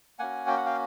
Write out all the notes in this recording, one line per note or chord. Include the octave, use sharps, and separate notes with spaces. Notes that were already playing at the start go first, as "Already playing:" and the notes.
A#3 C#4 F#4 F#5 G#5
G5
F#5
F5 G5